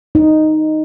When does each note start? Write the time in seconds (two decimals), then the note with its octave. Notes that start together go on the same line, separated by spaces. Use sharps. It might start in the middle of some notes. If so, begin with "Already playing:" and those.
0.15 D#4